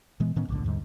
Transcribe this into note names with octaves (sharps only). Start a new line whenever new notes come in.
A#2 E3 G#3 B3
A2 D#3 B3 C#4
A#1 D#2 A2 D3
D#2 G#2 D3 G3